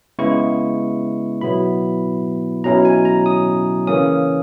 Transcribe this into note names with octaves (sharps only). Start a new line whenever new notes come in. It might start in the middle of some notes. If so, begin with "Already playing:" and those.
C#3 G#3 B3 E4 C#6
B2 F#3 B3 E4 B5
B2 F#3 C#4 E4 A#5
G#5
A#5
D#6
C#3 E3 A#3 C#4 D#6